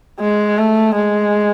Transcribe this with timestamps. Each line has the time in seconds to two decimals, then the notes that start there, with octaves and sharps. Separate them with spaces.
0.20 G#3
0.58 A3
0.95 G#3